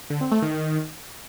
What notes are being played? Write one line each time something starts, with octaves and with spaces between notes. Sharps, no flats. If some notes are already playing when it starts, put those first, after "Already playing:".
D3
C4
A3
D#3